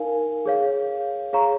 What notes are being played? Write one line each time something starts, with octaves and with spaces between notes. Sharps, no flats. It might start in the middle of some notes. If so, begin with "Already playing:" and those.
Already playing: D#4 A#4 F5 G#5
G#4 C#5 F5
G#4 C#5 F5 A#5 C#6